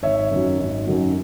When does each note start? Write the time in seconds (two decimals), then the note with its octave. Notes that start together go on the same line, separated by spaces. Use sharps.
0.03 G#1 C#5 E5
0.31 F#2 D#3 F#3
0.60 G#1
0.87 F#2 D#3 F#3